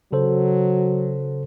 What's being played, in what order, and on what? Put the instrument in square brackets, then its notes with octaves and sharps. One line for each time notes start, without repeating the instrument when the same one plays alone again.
[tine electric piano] C#3 A4 C5 [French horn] F#3